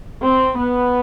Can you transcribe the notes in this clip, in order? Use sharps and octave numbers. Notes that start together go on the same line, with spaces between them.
C4
B3